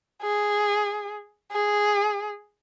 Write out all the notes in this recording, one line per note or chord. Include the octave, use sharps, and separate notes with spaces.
G#4
G#4